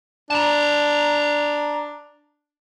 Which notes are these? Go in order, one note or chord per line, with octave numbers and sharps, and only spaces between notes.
D4 A5 A#5